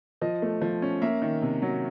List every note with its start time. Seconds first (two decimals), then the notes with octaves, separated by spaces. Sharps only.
0.22 F3 D#5
0.42 A3
0.62 F3
0.82 C#4
1.02 A#3 E5
1.22 D#3
1.42 C3
1.62 F#3